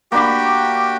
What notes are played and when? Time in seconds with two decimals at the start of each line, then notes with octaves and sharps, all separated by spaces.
0.12 A#3 D4 F#4 G4 G5 B5